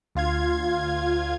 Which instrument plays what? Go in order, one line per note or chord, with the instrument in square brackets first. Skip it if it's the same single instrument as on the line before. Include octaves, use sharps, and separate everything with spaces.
[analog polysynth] D2 F4 F5 G#6